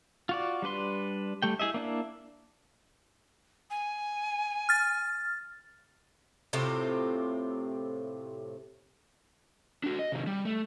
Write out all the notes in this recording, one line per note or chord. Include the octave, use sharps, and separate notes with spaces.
F4 F#4 D5
G3 D4 B4 C6
G3 A3 G5
E4 G#4 D#5 E5
A#3 D4 E4
G#5
F6 A6
A2 C3 C4 F4
D4 F#4
D#5
C3 D#3
G3
A3